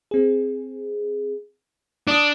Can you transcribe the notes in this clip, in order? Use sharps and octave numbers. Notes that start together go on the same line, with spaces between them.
C4 G#4
D4 D6 D#6